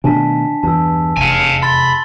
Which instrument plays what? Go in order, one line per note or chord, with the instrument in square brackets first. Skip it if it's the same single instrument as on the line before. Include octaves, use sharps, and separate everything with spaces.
[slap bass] B2 D#3 A3 [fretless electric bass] D4 [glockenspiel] G#5 A5 B6
[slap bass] E2 G2 E3 [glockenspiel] A5 E6
[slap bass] F1 E2 [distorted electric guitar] F5 G#5
[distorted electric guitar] B5 [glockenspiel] C6 A6 G7